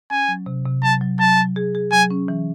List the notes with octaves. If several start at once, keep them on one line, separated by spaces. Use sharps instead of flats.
C#4 G#5
F#3
C3
C3
F#3 A5
F#3
F#3 A5
F#3
G#4
G#4
F#3 G#5
C#4
E3